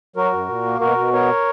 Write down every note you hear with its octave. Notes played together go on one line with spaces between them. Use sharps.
F#3 F#4 A#4
F#2
A#2
A#3
B2 F#4 A#4
B2
B3 A#4 C#5